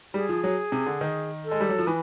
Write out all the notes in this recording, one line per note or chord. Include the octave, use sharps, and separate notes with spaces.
G3 G#4
F3
F#3
C3
D3
D#3
A4
G#3
G3
F#3
F3
E3 B4